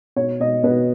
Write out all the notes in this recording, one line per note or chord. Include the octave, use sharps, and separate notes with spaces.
B2 C#5
B2 D#5
B2 B4